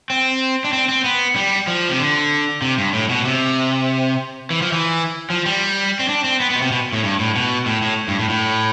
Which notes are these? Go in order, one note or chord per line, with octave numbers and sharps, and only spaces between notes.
C4
D4
C4
C4
B3
G3
F3
C3
D3
C3
G2
A2
B2
C3
E3
F3
E3
F3
G3
C4
D4
C4
B3
B3
B2
C3
B2
A2
G2
A2
B2
A2
A2
G2
A2
A2